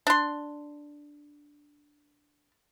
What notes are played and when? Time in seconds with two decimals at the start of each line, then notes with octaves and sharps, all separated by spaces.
0.07 D4 C6